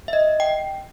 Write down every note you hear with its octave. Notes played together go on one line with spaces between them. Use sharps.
E5
D#5
G5